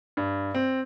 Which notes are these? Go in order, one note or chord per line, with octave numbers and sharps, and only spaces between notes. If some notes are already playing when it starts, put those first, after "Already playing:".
G2
C4